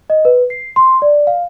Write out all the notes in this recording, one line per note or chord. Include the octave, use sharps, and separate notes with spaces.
D#5
B4
C7
C6
D5
F5